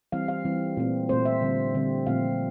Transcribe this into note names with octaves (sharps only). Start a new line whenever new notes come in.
E3 G3 C4 F5
F5
E3 G3 C4
A#2 A3 C4
A#2 A3 C4 C5
E5
D3 G3 C4
D3 G3 C4
A#2 F3 A3 C4 F5